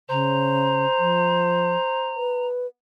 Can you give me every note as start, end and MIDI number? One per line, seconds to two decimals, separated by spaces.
0.10 0.86 49
0.10 2.24 72
0.10 2.47 82
0.99 1.76 53
2.16 2.67 71